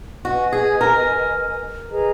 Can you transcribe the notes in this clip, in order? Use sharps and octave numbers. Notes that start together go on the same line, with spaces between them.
F#4 B4 D#5 G#5
G#4
A#4
G#4 B4 D#5 A#5